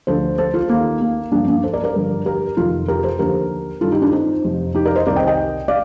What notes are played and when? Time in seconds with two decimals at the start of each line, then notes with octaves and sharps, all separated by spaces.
0.07 D2 D3 F3 A4 C5
0.38 A4 C5
0.54 F4 A4
0.70 D#2 D#3 A#3
1.02 A#3
1.32 G2 F3 A#3 D4
1.48 A#3 D4
1.64 A4 C5
1.73 A#4 D5
1.84 A#4 D5
1.95 G2 D3 F3
2.26 G4 A#4
2.57 F2 C3 D#3 F4 A4
2.88 G4 A#4
3.04 A4 C5
3.19 D#2 D3 F3 G4 A#4
3.81 G2 D#3 F4 A4
3.92 D#4 G4
4.02 D4 F4
4.13 C4 D#4
4.44 F2 C3 F3
4.75 D#4 G4
4.85 A#4 D5
4.96 C5 D#5
5.06 C2 C3 D#3 A#4 D5
5.16 D#5 G5
5.27 D#5 G5
5.68 D5 F5